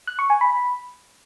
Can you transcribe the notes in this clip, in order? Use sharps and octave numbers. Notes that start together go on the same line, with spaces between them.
F#6
C#6
G#5
B5